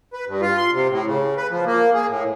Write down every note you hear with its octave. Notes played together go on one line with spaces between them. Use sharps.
B4
G2
F4
C6
C3
A2
C#3
B4
F3
A#3
G#4
A2